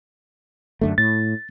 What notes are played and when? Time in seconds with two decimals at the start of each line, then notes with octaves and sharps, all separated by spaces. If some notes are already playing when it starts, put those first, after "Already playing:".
0.81 F#2 D3 A3
0.98 A2 A6